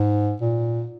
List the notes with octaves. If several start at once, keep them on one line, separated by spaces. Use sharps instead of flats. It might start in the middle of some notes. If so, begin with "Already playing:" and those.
Already playing: G#2
A#2